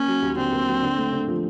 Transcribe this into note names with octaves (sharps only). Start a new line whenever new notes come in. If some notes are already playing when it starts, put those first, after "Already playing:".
Already playing: A#3 C#4
F#3
D#2
D3 C4
A#3
F#3
D3
A3
D3
F3